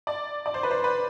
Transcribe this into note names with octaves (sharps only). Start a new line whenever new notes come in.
D5
D5
C5
B4
C5
B4